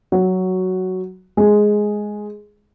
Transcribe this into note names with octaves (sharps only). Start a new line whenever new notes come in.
F#3 F#4
G#3 G#4